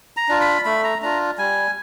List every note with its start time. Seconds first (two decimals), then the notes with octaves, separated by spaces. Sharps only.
0.17 A#5
0.29 D4 F4
0.41 B5
0.65 A3 B5
0.84 A#5
1.02 D4 F4 A#5
1.38 G3 G#5